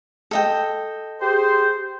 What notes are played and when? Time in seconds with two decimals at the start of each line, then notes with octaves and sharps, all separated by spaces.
0.31 A4 D#5 G5
1.20 G4 G#4 C5